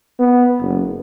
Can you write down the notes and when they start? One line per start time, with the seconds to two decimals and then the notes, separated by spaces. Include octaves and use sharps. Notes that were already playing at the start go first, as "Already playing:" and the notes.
0.19 B3
0.61 F#1